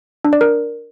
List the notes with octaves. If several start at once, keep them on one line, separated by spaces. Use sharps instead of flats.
D4
D5
A#4